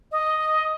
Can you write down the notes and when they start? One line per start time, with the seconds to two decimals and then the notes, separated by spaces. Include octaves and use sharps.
0.12 D#5